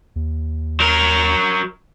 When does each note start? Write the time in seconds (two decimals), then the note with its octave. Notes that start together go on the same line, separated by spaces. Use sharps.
0.16 D#2
0.80 F#3 A#4